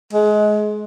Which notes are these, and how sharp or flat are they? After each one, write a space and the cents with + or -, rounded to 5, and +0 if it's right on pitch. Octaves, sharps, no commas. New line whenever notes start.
G#3 +25